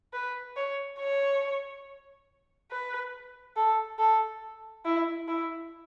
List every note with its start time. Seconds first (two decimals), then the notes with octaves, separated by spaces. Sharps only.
0.13 B4
0.56 C#5
0.99 C#5
2.71 B4
3.56 A4
3.99 A4
4.85 E4
5.28 E4